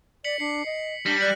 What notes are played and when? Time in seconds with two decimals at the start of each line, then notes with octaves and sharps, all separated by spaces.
0.24 D5 B6 C#7 F#7
0.39 D4 C7 C#7
0.66 D#5
1.06 G3 D4 A#6
1.21 D5 F#6 F#7